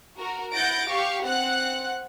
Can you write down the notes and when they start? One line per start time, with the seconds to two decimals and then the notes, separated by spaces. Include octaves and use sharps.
0.18 F#4 A#4
0.52 E4 F#5 G6 A6 A#6 D7
0.89 G4 F5 C#6
1.25 C4 F#5 F#6